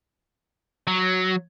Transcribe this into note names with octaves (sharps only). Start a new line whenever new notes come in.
F#3